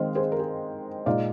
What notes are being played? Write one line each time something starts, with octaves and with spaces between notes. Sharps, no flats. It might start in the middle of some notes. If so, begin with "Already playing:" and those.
Already playing: D#3 G#3 C4 C5 D#5 F5
G#4 C5
A#4
G#4
A#2 G#3 D#4 D5 F5